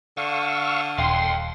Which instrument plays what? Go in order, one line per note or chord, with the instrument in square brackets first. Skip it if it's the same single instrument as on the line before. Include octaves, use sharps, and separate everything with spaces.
[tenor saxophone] D3 [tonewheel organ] F5 C#6 E6
[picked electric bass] D#1 [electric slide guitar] F5 G5 [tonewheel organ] C6